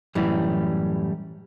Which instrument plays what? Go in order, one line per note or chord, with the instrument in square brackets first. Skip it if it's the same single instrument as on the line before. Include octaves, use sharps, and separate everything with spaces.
[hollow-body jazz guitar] F#2 A2 E3 G3